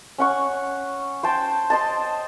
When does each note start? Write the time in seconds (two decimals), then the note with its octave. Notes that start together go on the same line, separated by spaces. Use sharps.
0.18 C#4 F#5 C#6
1.23 C5 G5 A5
1.70 C5 D#5 A5